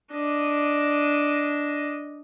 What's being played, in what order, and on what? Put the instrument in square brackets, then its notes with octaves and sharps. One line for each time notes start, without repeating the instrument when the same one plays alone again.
[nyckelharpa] D4 D#5